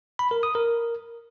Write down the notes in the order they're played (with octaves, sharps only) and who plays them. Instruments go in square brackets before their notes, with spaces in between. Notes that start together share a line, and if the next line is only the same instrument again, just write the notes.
[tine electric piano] B5
A#4
D#6
A#4